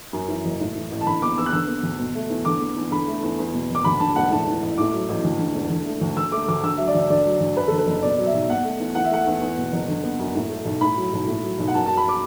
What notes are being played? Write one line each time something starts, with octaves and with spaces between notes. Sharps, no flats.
F#2
E3
F#1
A2
E3
A1
A5
D3 B5
B3 D6
E2 E6
F#6
D3 E6
B3
D2
B2
A3
E2
D3 D6
B3
E2
D3 B5
A3
E2
E2
B2
F#1 D6
D2 B5
D3 A5
E1 F#5
A2 A5
E3
A1
A2 D6
F#3
A1
D2
D3
E1
D3
A3
D2
D3 E6
A3 D6
D2 D6
D3 E6
F#3 E5
D5
D2
D3 D5
F#3
D2
F#2 B4
D3 A4
B4
F#1
B2 D5
F#3
E5
B1
B2 F#5
A3
E2
E3 F#5
E5
A3 F#5
E2
E2
B2
F#1
D3
B3
F#2
A2
A3
B1
A2 B5
F#3
B1
A2
F#3
B1
F#5
F#2 A5
A5
F#3
B5
D6